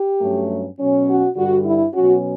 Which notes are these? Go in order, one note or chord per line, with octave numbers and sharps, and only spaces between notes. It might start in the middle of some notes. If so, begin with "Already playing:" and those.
Already playing: G4
G2 F#3 A3 C#4
B2 F#3 C#4
F#4
G2 D3 G3 F#4
E4
B2 F#3 C#4 F#4